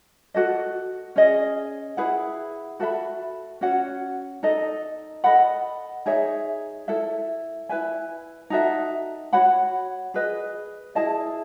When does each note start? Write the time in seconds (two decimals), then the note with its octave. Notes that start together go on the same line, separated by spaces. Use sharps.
0.34 F#4 A4 D#5
1.16 C#4 G#4 D#5
1.97 E4 G#4 B4 F#5
2.80 F#4 A4 E5 B5
3.61 C#4 F#4 C#5 F#5
4.43 D#4 A4 D#5
5.24 A4 D#5 F#5 B5
6.06 D#4 G#4 C#5 E5
6.88 E4 A4 E5
7.69 E4 B4 E5 G#5
8.50 D#4 F#4 A4 E5
9.33 F#4 C#5 F#5 B5
10.14 G#4 B4 D#5
10.95 E4 G#4 D#5 A5